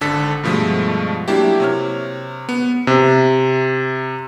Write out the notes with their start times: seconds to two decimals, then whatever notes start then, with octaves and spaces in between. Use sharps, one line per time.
0.01 G#1 D3 A4 B6
0.44 G2 B2 F3 G#3 A3
1.28 F#3 A#3 D4 E4 G4
1.60 C3 C#5 F6
2.49 B3
2.87 C3